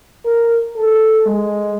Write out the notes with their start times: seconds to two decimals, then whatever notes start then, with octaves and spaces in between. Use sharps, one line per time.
0.25 A#4
0.76 A4
1.26 G#3